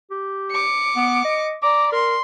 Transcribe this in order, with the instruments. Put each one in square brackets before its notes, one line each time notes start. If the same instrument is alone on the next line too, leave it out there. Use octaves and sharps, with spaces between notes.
[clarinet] G4
[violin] D6 C#7
[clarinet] B3
D#5
[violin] D5 A#5 [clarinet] D6
[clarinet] A#4 [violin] C6